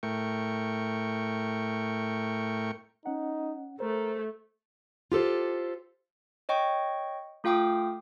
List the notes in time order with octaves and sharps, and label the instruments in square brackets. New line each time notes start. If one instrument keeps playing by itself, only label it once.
[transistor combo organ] A2 A3 A#4 G5 C#6
[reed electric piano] C#4 F#5 [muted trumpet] D#4
[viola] A3 [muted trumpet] A#4 [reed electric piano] C5
[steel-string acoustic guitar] F4 G4 A4 C5
[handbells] C#5 D#5 G5 C#6
A3 F4 F5 G5 D6 D#6